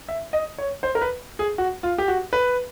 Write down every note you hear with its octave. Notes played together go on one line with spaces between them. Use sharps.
E5
D#5
C#5
C5
A#4
B4
G#4
F#4
F4
G4
F#4
B4